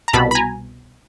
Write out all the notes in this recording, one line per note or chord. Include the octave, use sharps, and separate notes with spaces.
A#5
C2 B2 A5 B5
B5
G#5 A#5